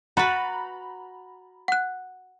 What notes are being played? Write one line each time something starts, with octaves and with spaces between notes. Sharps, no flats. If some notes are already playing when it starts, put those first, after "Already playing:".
F#4 B4 A#5 B5 A6
F#5 F#6